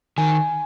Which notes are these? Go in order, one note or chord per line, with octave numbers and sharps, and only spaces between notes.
D#3 G#5